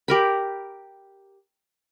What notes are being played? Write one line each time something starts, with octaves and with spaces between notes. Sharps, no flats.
G4 A#4 B5